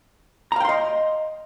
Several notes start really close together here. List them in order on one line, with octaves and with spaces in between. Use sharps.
A#5 F5 G5 C6 D#5